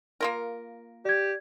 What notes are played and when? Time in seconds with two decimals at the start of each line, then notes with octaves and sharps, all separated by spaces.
0.21 A#3 F4 A#4
1.05 G4 D5 G#6